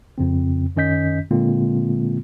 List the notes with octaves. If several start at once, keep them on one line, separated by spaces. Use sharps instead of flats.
F2 C#3 C4
F#2 D#3 C#4 D#5 G6 B6
A#2 D3 G#3 A#3 C4 F4